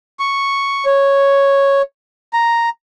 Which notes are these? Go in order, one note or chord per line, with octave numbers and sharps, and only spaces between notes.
C#6
C#5
A#5